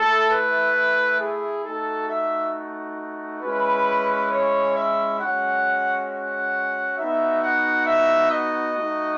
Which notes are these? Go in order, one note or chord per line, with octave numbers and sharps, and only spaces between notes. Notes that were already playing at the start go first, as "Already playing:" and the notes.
Already playing: A3 E4 A4
B4
G#4
A3 D#4 F#4 A4
E5
G#3 C#4 E4 B4
C#5
E5
G#3 C#4 F#4 F#5
F#5
B3 D#4 F#4 E5
F#5
E5
D#5
A3 D#4 F#4